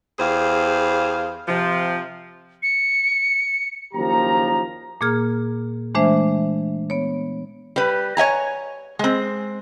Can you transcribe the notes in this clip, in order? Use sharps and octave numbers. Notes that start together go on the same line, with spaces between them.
E2 G4 G#4 C5 F5
C3 F3
C#7
F#1 D#2 F3 G4 A#5
A#2 A#3 G#4 F6
E3 G#3 A3 D4 C5 E5
B3 C#5
G3 B4
C#5 E5 G#5 A#5
G#3 C4